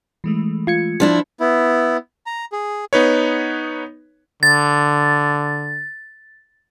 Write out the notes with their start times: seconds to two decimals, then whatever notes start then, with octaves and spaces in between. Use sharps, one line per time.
0.24 E3 G#3 A3
0.67 F4 G#6 C#7
1.00 F3 D4 E4
1.40 B3 E4
2.26 A#5
2.52 G#4
2.93 B3 D#4 B4 C#5
4.43 D3 A6